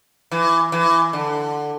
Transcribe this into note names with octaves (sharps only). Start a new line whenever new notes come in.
E3
E3
D3